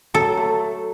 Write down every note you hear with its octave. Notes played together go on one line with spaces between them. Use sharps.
F#3 A4
A3